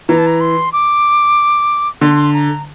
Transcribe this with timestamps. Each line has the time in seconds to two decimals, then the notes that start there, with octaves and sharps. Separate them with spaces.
0.09 E3 A#5
0.18 A5
0.26 A#5
0.41 C6
0.73 D6
2.01 D3 C6
2.34 A#5